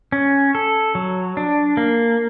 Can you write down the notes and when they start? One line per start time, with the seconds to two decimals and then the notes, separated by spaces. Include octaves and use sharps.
0.12 C#4
0.55 A4
0.95 F#3
1.37 D4
1.77 A#3